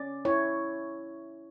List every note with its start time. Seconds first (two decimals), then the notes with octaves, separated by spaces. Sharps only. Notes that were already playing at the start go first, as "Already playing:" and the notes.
Already playing: C#4 D5
0.25 E4 C#5